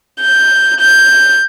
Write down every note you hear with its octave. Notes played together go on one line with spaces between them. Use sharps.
G6
G6